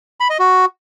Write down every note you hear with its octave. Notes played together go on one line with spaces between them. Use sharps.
B5
D#5
F#4